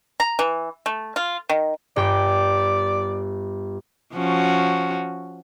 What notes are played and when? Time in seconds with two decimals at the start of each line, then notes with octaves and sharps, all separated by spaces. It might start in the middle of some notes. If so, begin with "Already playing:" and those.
0.20 A#5
0.39 E3
0.86 A3
1.16 F4
1.49 D#3
1.96 G1 D5 G5 D6
4.15 F3 C#4 F#4